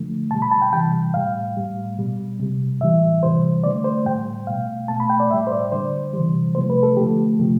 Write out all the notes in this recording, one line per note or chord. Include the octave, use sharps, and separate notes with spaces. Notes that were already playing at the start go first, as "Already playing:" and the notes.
Already playing: D3 F3 A3
B2 G3 A5
B5
A5
G5
C3 E3 G3 G5
A2 G3 F5
A2 G3
B2 G3
C3 G3
A2 E3 G3 E5
C3 E3 G3 C5
D3 A3 D5
C5
A2 G3 G5
B2 A3 F5
B2 A3 A5
B5
G5
D5
A2 G3 E5
C5
D5
D3 G3 C5
C3 E3 G3
C3 F3 A3 C5
B4
A4
D3 F3 A3 G4
C3 F3 A3